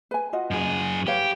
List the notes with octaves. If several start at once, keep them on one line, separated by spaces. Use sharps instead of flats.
B4 G#5
F4 F#4 D#5
F#2 G#4
G4 B4 C#5 F5